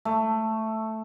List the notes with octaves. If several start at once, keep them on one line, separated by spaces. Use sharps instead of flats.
A3